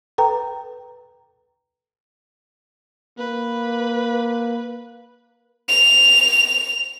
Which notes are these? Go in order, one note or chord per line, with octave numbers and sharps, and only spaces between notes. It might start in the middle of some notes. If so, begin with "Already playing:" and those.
A4 B4 G5 A#5
A#3 B4
F7